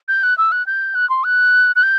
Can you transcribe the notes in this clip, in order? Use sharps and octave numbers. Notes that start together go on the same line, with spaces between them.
G6
F#6
E6
F#6
G6
F#6
C6
F#6
F#6
G6